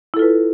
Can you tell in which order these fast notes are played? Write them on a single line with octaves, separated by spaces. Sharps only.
E4 A4 F4 B4